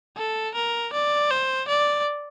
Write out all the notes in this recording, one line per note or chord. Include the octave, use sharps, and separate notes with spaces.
A4
A#4
D5
C5
D5